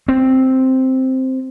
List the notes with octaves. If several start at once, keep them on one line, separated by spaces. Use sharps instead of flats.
C4